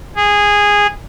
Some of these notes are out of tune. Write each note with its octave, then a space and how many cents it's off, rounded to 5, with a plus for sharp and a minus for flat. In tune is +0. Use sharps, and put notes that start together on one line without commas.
G#4 -15